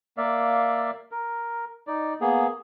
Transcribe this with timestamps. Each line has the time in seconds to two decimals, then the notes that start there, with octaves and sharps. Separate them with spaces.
0.17 A#3 D5 E5 F5
1.12 A#4
1.87 D#4 D5
2.21 A#3 B3 G#4